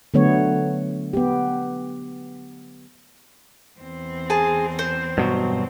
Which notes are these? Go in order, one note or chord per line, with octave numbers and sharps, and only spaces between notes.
D3 F#3 A3 B3 C#5
B3 G4
E2 C4
G#4 G#5 A5
C5
G2 B2 F#3